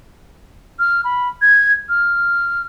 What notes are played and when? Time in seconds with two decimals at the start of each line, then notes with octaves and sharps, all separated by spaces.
0.79 F6
1.04 B5
1.42 G#6
1.89 F6